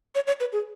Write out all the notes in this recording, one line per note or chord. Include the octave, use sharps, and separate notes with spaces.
C#5
C#5
B4
G#4